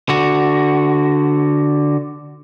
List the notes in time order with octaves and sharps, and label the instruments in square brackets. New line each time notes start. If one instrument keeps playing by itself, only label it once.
[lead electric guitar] D3 F#4